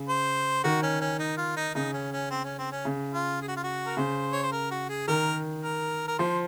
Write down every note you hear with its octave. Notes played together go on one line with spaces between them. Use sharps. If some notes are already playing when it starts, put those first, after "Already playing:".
Already playing: C#3
C5
D#3 F#4
C#4
C#4
D#4
F4
D#4
C#3 D#4
C#4
C#4
C4
C#4
C4
C#4
C#3
F4
G#4
F#4
F4
F#4
A#4
C#3 C5
C#5
C5
A#4
F#4
G#4
D#3 A#4
A#4
A#4
F3 C5